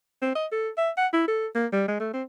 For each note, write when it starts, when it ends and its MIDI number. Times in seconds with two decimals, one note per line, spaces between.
0.22 0.35 60
0.35 0.46 75
0.52 0.69 69
0.78 0.90 76
0.97 1.07 78
1.13 1.25 64
1.28 1.47 69
1.55 1.67 58
1.72 1.87 55
1.88 1.98 56
2.00 2.10 57
2.13 2.23 60